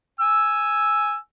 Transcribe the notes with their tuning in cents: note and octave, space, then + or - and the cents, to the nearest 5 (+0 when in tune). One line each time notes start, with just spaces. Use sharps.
G#5 +0 E6 +0